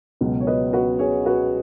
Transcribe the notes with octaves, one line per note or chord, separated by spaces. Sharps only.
C#2 B2 F#3
C#5
B4 D#5
F#4 B4
G#4 C#5
F#4 B4